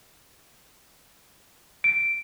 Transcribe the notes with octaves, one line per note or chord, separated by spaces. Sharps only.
D7